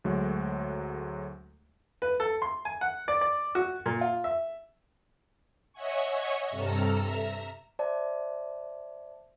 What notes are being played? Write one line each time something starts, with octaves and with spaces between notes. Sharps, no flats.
D2 F#3 G#3 A3
B4
A4
C6
G#5
F#5
D5
D5
F#4
A#2
F4
E5
C#5 D#5 E5 F#5 G#5 C#6
G2 C3 A4 A#5 E6 F6
E5 A#5
C5 D5 E5 A5